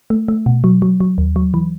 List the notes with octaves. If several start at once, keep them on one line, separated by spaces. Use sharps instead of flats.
A3
A3
B2
F#3
F#3
F#3
D#2
F#3
E3